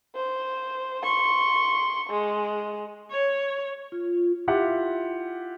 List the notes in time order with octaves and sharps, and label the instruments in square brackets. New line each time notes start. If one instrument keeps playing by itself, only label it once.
[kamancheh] C5
C6 C#6
G#3
[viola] C#5
[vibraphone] F4
[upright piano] E4 F4 G4 E5 F#5